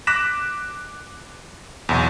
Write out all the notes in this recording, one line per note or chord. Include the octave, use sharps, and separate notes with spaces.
D6 F#6 A#6 B6 E7
B1 E2